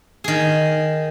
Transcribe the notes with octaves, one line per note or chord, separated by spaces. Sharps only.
D#3 G#4